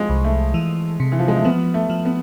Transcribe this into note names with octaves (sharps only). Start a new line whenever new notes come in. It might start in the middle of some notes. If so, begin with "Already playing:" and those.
Already playing: F3 G#3
C2
A3
E3
C3
E3
F3
G#3
A3
F3 B3
A3
F3
B3